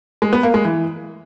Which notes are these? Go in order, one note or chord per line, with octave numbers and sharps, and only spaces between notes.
G#3
B3
A#3
G#3
E3